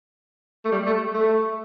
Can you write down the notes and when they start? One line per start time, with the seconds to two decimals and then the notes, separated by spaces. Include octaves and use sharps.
0.65 A3
0.72 G3
0.86 A3
1.14 A3